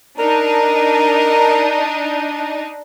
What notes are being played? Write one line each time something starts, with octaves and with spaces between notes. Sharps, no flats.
D4 D#4 A#4